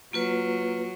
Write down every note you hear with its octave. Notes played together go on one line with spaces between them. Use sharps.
F#3 A#3 F4 B4